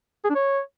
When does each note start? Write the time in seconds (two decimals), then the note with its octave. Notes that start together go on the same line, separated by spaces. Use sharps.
0.24 G#4
0.30 D4
0.35 C#5